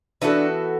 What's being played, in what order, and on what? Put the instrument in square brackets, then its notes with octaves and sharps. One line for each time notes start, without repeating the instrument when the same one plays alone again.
[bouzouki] E3 B3 F#4 A4 [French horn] D4